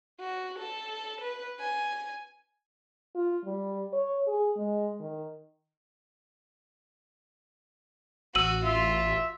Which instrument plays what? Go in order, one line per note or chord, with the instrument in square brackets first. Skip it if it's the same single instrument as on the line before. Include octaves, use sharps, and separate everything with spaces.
[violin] F#4
A4
B4
G#5
[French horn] F4
G3
C#5
G#4
G#3
D#3
[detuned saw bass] A1 [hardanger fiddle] F#4 [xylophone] E6 D#7 F#7
[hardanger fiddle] F4 [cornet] E5